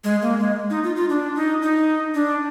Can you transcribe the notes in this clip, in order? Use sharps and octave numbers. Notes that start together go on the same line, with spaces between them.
G#3
A#3
G#3
D#4
F4
F4
D4
D#4
D#4
D4